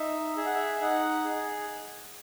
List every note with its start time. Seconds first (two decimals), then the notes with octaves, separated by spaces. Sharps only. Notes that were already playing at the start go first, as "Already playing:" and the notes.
Already playing: D#4 E5
0.37 G#4 E5
0.46 F#5
0.55 E5
0.80 D#4 F#5
1.25 G#4